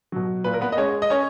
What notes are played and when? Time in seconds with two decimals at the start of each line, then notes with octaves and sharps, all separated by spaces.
0.12 B2 F#3
0.44 A#2 B4
0.54 A#4
0.61 B3 B4
0.72 D#5
0.77 G#3 C#4 C#5
1.02 D#5
1.10 C#4 C#5